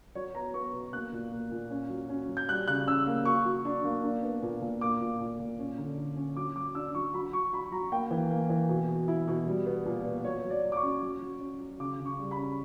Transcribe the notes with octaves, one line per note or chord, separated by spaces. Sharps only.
F#3 C#5
B3 A#5
B3 C#6
B2
A#3 F#6
A#2
A#3
A#2
C#4
F#3
C#4
F#3
G6
G3 F#6
C#3 F#6
C#4 E6
A#3
F#3 C#6
F#3
D4
A#3
D4
B3
A#2
A#2
A#3 D6
A#2
A#2
A#2
C#4
D3
D3
C#4
F#3 D6
F#3 D6
D4 E6
F#3 C#6
F#3 B5
F#3 C#6
F#3 B5
F#3 A#5
A#3 G5
E3
A#3
E3
B2
B2
E4
B2
G3
B3
A#2
B3
F#3 C#5
F#3
D5
F#3
D6
C#6
C#4
F#3
F#3
C#4
F#3
C#3 D6
C#3
C#6
G3
B5
C#4